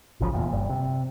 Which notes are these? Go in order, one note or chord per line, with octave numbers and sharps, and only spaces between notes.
G#1 C#2 C#3 F3
F1 E2 A#2
G1 G2
C3